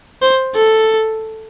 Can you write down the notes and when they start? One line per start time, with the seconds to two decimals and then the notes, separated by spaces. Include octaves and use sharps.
0.22 C5
0.55 A4